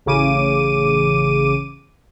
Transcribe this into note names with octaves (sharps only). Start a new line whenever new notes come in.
A1 C#3 D6 D#7